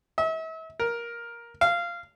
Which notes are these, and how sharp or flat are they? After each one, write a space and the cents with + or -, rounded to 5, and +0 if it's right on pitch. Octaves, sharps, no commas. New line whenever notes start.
E5 -40
A#4 +10
F5 -15